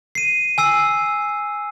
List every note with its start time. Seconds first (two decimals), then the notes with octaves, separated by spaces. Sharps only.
0.15 C7 D#7
0.58 G#5 E6 C7